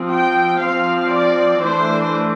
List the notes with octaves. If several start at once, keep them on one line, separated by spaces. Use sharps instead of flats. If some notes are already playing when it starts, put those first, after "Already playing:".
Already playing: F3 C4
G5
F3 C4 F5
D5
E3 A3 D4 C5